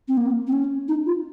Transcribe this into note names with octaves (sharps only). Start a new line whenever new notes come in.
C4
A#3
C4
C#4
D#4
F4